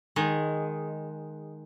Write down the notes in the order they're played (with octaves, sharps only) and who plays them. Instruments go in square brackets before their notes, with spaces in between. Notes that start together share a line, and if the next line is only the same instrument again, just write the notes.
[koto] D#3 G#3